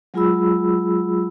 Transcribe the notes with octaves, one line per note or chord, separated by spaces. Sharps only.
F#3 G#3 F4 G#4 B5 E6